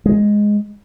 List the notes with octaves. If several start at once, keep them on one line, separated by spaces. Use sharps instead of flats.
G#3